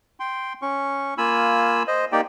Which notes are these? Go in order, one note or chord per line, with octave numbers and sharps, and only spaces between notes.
G5 C6
C#4 C#6
A#3 F4 G#5 B5 E6
C5 D#5
A#3 D#4 G4 D5 G5